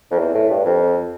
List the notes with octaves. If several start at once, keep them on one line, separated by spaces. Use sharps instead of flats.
F2
E2
A2
G2
F2